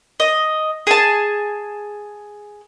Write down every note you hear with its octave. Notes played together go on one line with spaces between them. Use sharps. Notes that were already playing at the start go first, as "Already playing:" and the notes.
D#5
G#4 A5